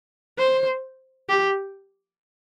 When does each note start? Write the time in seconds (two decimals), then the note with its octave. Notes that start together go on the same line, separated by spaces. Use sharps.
0.38 C5
1.29 G4